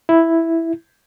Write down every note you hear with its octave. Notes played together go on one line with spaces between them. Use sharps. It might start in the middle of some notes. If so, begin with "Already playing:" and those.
E4